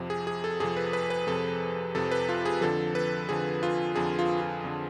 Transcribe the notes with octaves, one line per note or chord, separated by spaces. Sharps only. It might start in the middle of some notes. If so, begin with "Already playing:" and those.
Already playing: F2 C3 F3
G#4
G#4
A4
F2 C3 F3 G#4
B4
B4
B4
F2 C3 F3 A4
F2 C3 F3 A4
B4
F4
G#4
F2 D3 F3 A4
B4
F2 D3 F3 G#4
F4
F2 D3 F3 G#4
F4
F4
F2 D3 F3